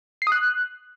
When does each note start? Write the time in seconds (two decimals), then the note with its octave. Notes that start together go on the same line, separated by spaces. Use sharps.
0.22 C7
0.27 D#6
0.32 F#6